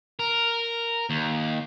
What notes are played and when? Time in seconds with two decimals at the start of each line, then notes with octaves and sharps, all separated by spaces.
0.19 A#4
1.10 D#2